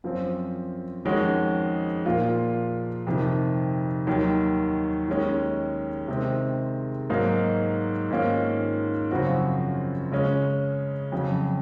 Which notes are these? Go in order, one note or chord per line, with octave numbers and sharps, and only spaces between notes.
F#2 F3 C4
F2 D#3 G#3 C#4 F#4
A#2 F3 A#3 F4
F2 C3 D#3
D#2 D#3 F#3
D#2 D#3 G#3 C#4
C3 D#3 G#3 C4
G#2 F#3 A#3 D#4
G#2 D#3 A#3 C#4 F4
F#2 C#3 F3 C4 F#4
C#3 G#3 C#4
F2 C#3 F#3